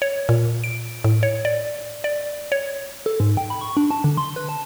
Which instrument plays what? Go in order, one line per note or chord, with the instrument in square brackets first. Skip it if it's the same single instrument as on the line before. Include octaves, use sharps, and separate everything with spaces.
[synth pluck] C#5
A#2
D7
A2
C#5
D5
D5
C#5
[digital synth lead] A4
G#2
G5
B5
C#6
D4
A5
D3
C6
B4
A5